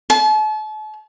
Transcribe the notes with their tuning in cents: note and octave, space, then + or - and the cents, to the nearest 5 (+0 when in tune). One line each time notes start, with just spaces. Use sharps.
A5 -40